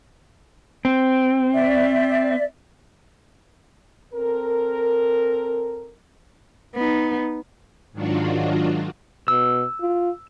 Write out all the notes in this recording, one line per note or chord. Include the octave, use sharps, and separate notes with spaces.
C4
D5 E5
C4 A4 A#4
B3 D#4
G#2 D#3 F#3 D4 F4 F#4
B2 E6
F4